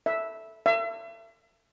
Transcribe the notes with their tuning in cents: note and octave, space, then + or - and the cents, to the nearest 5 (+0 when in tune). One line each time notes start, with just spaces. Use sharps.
E5 -5
E5 +40